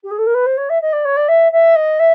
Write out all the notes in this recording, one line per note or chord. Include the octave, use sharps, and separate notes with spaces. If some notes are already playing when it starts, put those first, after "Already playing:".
G4
G#4
A4
A#4
B4
C5
C#5
E5
D#5
D5
C#5
D5
E5
E5
D#5
E5